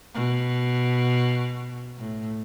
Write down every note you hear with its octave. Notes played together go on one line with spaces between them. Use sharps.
B2
A2